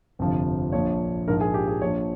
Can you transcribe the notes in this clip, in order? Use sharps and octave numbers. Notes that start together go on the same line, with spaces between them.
G1 F2 C3 F3
A#1 A#2 F3 C#5
A#1 G#2 F3 A#4
G#4
G4
G#4
A#1 A#2 F3 C#5